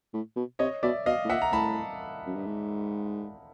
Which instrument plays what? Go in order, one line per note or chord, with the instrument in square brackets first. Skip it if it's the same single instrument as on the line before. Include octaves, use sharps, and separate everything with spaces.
[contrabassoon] A2
B2
[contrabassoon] C3 [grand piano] C#5 D#5
[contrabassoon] B2 [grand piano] D5 E5
[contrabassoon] B2 [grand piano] D#5 F5
[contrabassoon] A2
[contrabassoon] A#2 [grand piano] E5 F#5
[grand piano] A#5
[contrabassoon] A2 [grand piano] A5 B5
[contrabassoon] F#2
G2
G#2